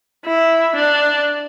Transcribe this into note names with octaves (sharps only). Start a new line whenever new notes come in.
E4
D4